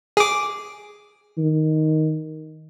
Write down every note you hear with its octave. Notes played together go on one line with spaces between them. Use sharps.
G#4 D6
D#3